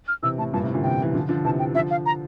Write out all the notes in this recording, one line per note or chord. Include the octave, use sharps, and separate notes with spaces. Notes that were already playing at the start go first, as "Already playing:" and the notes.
F6
C3 E3 E6
A2 A5
G2 A#2 A5
A2 C3
A#2 D3
C3 E3 G5
E3
D3 F3
D3 F3
C3 E3 A5
G5
D3 F3 E5
F5
A#5